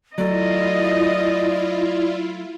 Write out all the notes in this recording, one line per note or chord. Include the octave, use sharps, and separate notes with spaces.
F#3 A3 E4 F4 D5 D#5